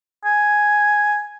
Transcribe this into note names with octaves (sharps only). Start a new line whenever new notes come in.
G#5